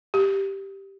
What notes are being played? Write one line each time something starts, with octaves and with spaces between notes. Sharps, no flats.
G4